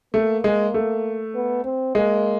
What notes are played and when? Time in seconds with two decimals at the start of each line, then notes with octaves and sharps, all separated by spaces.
0.14 A3 A#3
0.44 G#3
0.74 A3
1.35 B3
1.64 C4
1.95 G#3 A#3